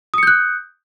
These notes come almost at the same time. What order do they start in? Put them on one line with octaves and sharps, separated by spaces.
D#6 C#7 G6 F#6